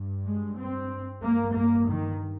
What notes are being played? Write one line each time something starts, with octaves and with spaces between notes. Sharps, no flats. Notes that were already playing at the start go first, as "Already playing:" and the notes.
Already playing: G2
G#3
C4
G2 A#3
A#3
D#3